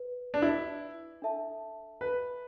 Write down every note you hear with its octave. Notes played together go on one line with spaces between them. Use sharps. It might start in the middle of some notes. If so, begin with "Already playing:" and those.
Already playing: B4
D4
E4
D4 A4 E5 A5
B4